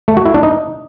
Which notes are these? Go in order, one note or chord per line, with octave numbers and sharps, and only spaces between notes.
A3
F#4
E4
D4
D#4